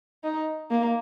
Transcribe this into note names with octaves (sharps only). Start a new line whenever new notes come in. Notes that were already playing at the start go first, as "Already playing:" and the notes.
D#4
A#3